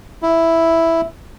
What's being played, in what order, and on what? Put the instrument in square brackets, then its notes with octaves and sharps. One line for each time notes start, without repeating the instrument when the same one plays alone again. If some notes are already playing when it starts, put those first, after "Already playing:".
[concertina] E4